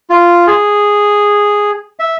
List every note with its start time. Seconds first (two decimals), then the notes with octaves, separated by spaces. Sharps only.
0.10 F4
0.47 G#4
1.99 E5